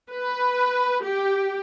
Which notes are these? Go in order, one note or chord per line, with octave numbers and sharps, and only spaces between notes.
B4
G4